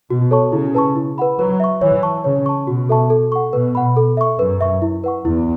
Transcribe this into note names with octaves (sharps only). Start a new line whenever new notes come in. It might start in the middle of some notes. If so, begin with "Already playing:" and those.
B2 F#4
A4 C#5 A5 C#6
C#3 E4
B4 A5 C#6
E4
B4 F#5 B5
F#3 B4
E5 C#6
E3 C#5
A5 C#6
C#3 C#5
A5 C#6
B2 F#4
A4 E5 A5 C#6
A4
F#5 C#6
B2 B4
F#5 B5
A4
E5 C#6
F#2 B4
E5 C#6
E4
B4 F#5 C#6
E2 E4